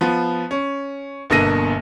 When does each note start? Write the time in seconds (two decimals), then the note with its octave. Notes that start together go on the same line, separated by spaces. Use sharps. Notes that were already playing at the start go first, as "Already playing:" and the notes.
0.01 F3 B3 F4
0.51 C#4
1.30 G1 B2 D3 A#3 A#6 D#7